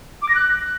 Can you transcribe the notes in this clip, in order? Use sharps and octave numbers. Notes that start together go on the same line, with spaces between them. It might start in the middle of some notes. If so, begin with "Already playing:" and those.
D6
A#6
F#6